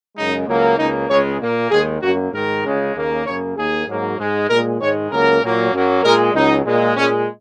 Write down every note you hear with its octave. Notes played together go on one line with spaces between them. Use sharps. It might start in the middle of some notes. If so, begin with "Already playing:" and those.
F#2 C#3 G#3 D#4
C#2 C#3 F#3 A#3
C#2 C#3 A#3 D#4
C#2 C#3 G#3 C#5
A#2 A#3
D#2 D#3 G#3 G#4
F#2 F#3 A#3 F#4
G#2 D#3 G#3 A#4
C#2 C#3 G#3
D#2 C#3 A#3
F#2 C#3 A#3 C#5
D#2 D#3 A#3 G#4
G#2 F#3 A#3
G#2 G#3
A#2 G#3 A#4
G#2 D#3 G#3 C#5
C#2 C#3 F#3 A#3 A#4
A#2 F#3 A#3
F#2 F#3 A#3
A#2 G#3 A#4
C#2 C#3 F#3 D#4
A#2 G#3
A#2 G#3 C#4